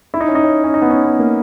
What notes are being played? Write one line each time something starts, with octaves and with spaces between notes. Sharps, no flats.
E4
D#4
C#4
D#4
C#4
C#4
D#4
B3
C#4
B3
A#3